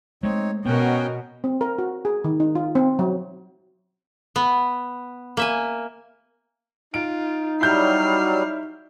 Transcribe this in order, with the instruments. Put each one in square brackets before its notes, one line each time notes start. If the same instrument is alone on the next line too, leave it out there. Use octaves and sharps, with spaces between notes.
[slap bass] G#3 A3 [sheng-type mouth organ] C4 D#4 C#5
[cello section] B2 [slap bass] B3 [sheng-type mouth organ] C#4 G5 [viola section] F#4 A#4 D#5
[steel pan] C4
A#4
F#4
G#4
D#3
D#4
F4
C4
F#3
[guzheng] B3
A#3 E5 G#5
[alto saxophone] D#4 [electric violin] F4 [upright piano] D7
[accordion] F#3 G3 [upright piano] E4 G6 [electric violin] F6 C7